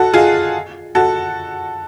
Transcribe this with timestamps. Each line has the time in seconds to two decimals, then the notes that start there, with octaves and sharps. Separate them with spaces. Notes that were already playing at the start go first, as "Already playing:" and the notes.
Already playing: F#4 A4
0.14 F4 G#4
0.95 F#4 A4